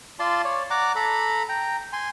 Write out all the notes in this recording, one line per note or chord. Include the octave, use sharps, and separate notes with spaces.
F4 D5 A5 C6
C#5 D5
D5 F#5 A#5 D6
A4 A#5 B5
G5 A#5
G#5 C6